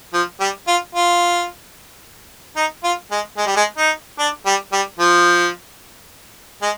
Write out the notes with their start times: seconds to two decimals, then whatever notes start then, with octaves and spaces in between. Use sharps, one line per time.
0.14 F3
0.40 G3
0.68 F4
0.95 F4
2.56 D#4
2.84 F4
3.11 G#3
3.38 G#3
3.47 G3
3.56 G#3
3.78 D#4
4.19 D4
4.46 G3
4.73 G3
4.99 F3
6.62 G#3